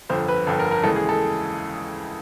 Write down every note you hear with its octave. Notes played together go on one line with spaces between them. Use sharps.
G1 F2 D3 C5
B4
G1 F2 D3 A4
A#4
A#4
D#2 C#3 E3 G#3 A4
G#4
A4